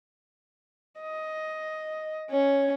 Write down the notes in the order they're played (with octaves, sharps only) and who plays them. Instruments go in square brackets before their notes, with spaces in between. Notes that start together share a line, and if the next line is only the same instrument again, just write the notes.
[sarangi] D#5
[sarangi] C#4 [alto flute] C#5